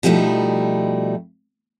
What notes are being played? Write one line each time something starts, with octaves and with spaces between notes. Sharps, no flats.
B2 F3 G3 A3 D#4 E4